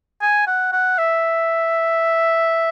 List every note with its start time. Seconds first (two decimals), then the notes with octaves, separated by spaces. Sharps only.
0.21 G#5
0.47 F#5
0.73 F#5
0.98 E5